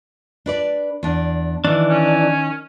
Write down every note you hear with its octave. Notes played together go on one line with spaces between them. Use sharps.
D4 B4 D5
E2 D4
D#3 E3 D4
C#4